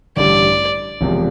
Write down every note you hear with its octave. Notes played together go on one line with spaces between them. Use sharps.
A1 G2 D3 G3 D5
E1 E2 C3 F3